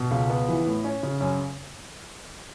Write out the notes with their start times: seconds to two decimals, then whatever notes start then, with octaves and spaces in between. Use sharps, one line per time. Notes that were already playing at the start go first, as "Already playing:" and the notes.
Already playing: B2
0.11 C#2
0.30 B3
0.49 E3
0.66 A2
0.84 C#4
1.03 C#3
1.21 F#2